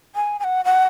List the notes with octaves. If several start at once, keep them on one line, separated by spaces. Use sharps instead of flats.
G#5
G#5
F#5
F#5